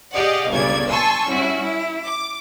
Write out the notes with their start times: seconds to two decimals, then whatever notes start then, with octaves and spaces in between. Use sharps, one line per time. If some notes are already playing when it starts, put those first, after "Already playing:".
0.13 G4 G#4 D5 D#5 F5 F#5
0.50 G1 C#2 C#3 D5 G#6
0.90 G#5 A5 C6 C#6 E6
1.26 G3 C#4 E4 F#4
1.60 E4
2.06 D6